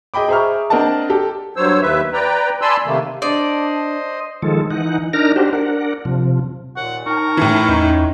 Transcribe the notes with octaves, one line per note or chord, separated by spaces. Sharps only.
G#4 D#5 G5 B5 D6
G#4 C5 E5 A#5 C#6 F6
C4 D4 A#4 D#5 F#5 A5
G4 A4
G2 F#3 C5 C#5 E6
D#2 D#3 B4 E5
B4 D5 G5 A#5
D5 G#5 A5 B5 C6 E6
C3 D#3 A3 A#3
D4 C5 D5 D#5
D#3 F3 G#3 A4
E3 D#4 F#5
D4 D#4 A#4 F6 A#6
D4 F#4 G4 C5
D4 A#4 F#5
C3 F3
D#2 A#2 F#5
D#4 A#4 G5 A5 C#6
A2 E3
E2 C#4 D#4 C#6